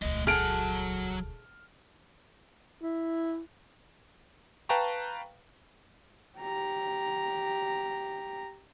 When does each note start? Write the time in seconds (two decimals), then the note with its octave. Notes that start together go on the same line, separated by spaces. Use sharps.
0.02 D#1 C#2 A3 D#5
0.27 F#3 G#4 A4 F#5 F6 D7
2.81 E4
4.69 B4 F5 G5 A5 A#5 C#6
6.39 G4 A#5